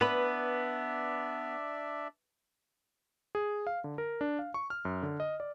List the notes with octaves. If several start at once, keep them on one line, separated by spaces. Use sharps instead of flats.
B3 D4 B4 D5 E5 B5
G#4
F5
D3
A#4
D4
F5
C#6
F6
F#2
D3
D#5
D5